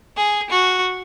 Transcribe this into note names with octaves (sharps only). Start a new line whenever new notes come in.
G#4
F#4